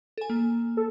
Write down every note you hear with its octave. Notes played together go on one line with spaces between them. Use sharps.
A4 G#5
A#3
A4